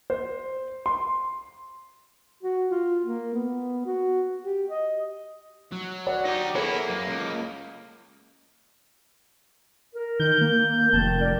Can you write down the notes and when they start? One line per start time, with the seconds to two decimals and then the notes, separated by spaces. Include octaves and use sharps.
0.10 C5
0.86 C6
2.43 F#4
2.70 F4
3.05 A#3
3.33 B3
3.86 F#4
4.44 G4
4.70 D#5
5.72 F#3
6.07 C#5 D5 F#5
6.25 D#4 G4
6.55 A#3 B3 E4 G#4 A4 C#5
6.90 F#2
7.10 C#2
9.96 A#4
10.20 D#3 G6
10.41 A#3
10.93 F1 D#3 A5
11.21 A#4 D5